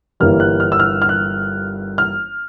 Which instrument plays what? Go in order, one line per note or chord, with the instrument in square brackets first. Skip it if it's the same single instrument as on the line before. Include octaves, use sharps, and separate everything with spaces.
[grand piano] G1 G2 E3 G3 A#3 F6
F#6
F6
E6
F6
F6
F#6
F6